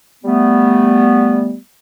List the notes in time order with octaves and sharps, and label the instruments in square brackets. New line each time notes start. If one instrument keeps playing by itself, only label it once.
[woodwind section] G3 A3 B3